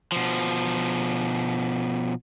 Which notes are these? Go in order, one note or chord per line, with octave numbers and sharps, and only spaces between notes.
B2 F3